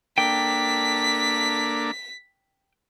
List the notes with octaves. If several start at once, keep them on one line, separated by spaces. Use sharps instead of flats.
A#3 D4 A4 G5 B6